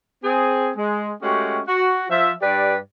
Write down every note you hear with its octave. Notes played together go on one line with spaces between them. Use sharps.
C4 G#4
G#3
G#3 A3 C#4 F#4 G4
F#4
F3 E5
G2 G4 B4 D5